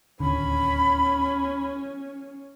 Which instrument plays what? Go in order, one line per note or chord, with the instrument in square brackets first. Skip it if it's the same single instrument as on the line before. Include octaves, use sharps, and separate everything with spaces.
[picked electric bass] D1 D#2 D3 [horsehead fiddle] C#4 [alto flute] B5